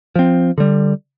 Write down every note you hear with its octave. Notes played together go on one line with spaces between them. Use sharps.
F3 C4
D3 G3